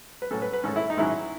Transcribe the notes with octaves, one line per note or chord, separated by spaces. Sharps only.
B4
A2 F#3 C#4 A4
B4
B4
G#2 D#3 A3 C#4 A4
E4
D#4
G#2 D#3 F#3 C#4 E4